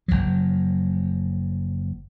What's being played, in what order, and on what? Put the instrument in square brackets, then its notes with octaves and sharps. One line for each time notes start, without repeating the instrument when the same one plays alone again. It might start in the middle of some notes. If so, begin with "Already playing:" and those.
[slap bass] F#1 C2 F3 F#3